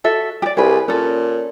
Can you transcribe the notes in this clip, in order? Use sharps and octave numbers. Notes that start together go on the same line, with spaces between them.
F#4 A4 E5
G4 D5
C2 G#4 B4
A#2 C#4 A4